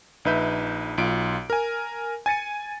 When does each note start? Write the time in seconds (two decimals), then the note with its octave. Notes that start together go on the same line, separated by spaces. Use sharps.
0.25 A#1 D#4 B4 E5 G6
0.98 B1 F4 D7
1.50 A#4 G#5
2.26 G#5 A6 C#7 D#7